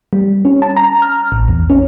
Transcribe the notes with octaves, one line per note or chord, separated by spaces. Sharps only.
G3
C#4
A5
A#5
F6
A1
E2
C#4